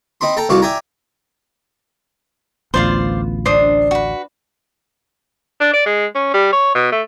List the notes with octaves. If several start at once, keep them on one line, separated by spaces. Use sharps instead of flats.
C4 D#4 B5 C6
A4 G5 A5 A#5
C2 F2 F#4 F5 D6
D5 E5 G5 G#5 A#5
A1 D2 B3 F4 C5 D5 F5
D4 C5 C6 D#6
F#4 B4
D4
D5
G#3
C#4
G3
C#5
B2
A3